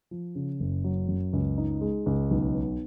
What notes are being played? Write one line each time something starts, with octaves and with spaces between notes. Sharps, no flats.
F3
C#3
F#1
F#3
F#2
C#2
D#4
G#3
C#2
B1
B3